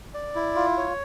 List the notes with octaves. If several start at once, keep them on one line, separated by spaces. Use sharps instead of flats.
D5
E4
F4
C#5